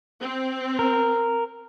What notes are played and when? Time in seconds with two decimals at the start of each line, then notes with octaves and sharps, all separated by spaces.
0.21 C4
0.79 A#4